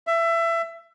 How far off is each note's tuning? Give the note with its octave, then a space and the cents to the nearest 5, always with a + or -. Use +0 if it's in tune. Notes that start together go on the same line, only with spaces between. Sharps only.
E5 +20